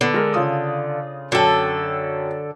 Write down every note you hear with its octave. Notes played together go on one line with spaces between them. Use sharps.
D3 B3
G#3 A#4
C#3 F4 D#6
F#2 D3 A4 G5